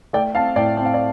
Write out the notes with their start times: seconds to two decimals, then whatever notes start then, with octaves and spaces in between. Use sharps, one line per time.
0.13 A3 D5 G5
0.35 C4 F5 A5
0.56 A2 D5 G5
0.77 C4 G5
0.85 F5
0.94 D5